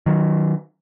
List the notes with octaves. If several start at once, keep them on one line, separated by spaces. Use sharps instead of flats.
D#3 F#3